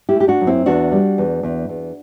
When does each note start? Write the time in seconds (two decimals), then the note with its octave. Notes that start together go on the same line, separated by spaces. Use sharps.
0.09 E4 G4
0.15 A3
0.20 G4
0.28 D4 F#4
0.41 F#2
0.47 C4 E4
0.66 E2 D4 F#4
0.92 G3
1.18 E2
1.43 E2
1.69 E2